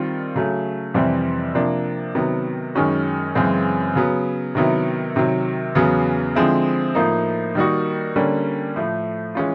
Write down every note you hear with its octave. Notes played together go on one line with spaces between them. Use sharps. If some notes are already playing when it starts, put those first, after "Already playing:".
Already playing: D#3 G3 C4 F4
C#3 F#3 A3
F2 C3 E3 G3 C4
C3 F3 A#3 D4
C3 D#3 F#3 B3
F#2 D#3 G#3 C#4 F#4
F#2 C#3 E3 G#3 C4
C#3 F#3 B3
C3 D#3 F#3 B3 E4
C3 D#3 F#3
E2 C#3 F#3 B3
D3 F3 G#3 C4 E4
A2 F3 A#3 D#4
D#3 G3 A#3 D#4 F#4
D3 G3 A#3 C#4
A2 F3 A3
E3 G#3 C#4 F4